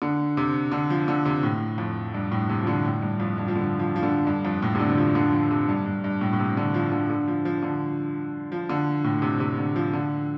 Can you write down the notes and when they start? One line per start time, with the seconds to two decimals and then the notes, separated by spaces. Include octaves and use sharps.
0.02 D3
0.37 C3
0.72 D3
0.90 F3
1.08 D3
1.25 C3
1.43 A2
1.78 F2
2.14 G2
2.31 A2
2.49 C3
2.63 F3
2.67 D3
2.84 A2
3.02 G2
3.20 F2
3.38 G2
3.48 F3
3.56 D3
3.79 F3
3.96 F3
4.03 D3
4.27 G2
4.45 F2
4.62 A2
4.75 C3
4.80 D3
4.90 D3
4.97 F3
5.15 D3
5.32 F3
5.51 C3
5.69 G2
5.86 G2
6.04 G2
6.21 A2
6.33 A2
6.39 C3
6.57 D3
6.74 F3
6.92 D3
7.10 D3
7.28 F3
7.45 F3
7.63 D3
8.52 F3
8.69 D3
9.04 A2
9.22 C3
9.40 C3
9.58 D3
9.76 F3
9.94 D3